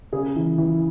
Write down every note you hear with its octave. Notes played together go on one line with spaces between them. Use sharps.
C#3 G#4
E3
E3